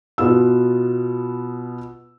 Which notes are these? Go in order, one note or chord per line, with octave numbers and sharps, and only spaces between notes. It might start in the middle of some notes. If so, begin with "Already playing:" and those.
B2 B3 F4 E6